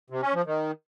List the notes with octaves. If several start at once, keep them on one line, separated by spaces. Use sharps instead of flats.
C3
C#4
F3
D#3